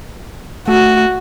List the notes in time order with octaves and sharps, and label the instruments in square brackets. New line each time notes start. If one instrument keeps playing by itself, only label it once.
[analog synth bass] A3 [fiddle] F#4